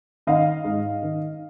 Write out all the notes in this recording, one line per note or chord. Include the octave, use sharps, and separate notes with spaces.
D#3 D#5 F5
G#2
D#3